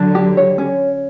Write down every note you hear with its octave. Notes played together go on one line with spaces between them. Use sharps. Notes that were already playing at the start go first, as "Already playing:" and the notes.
Already playing: D3 F#3 D4
G4
C#5
C#4